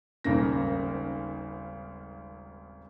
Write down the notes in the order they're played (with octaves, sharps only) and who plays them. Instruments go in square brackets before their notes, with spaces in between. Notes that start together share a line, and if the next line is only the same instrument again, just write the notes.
[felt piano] D#1 G#1 C#3 A#3 A#6